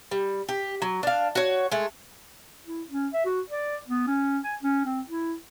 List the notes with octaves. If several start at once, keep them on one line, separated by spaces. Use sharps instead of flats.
G3
G4
F#3
D4 F5
F#4 C#5
G#3 A3
E4
C#4
E5
F#4
D5
B3
C#4
G#5
C#4
C4
E4